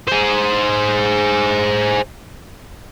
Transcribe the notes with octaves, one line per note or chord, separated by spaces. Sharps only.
G#4 C5